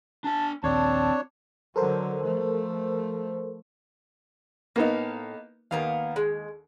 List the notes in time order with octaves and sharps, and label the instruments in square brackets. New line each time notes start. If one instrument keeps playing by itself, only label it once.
[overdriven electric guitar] D4 G#5 [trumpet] A5
[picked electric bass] A#1 D#2 [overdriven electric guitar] C4 [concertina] D4 C#5 [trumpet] A5
[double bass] D3 F#3 [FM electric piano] A4 A#4 C5
[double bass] F3 A3
[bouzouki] A2 F5 [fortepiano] A#3 B3 D#4
[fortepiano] D#2 [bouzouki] A#3 B3 F5
[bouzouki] G#3